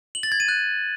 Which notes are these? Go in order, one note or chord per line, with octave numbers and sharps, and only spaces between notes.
F#7
A6
G#6
D#7
F#6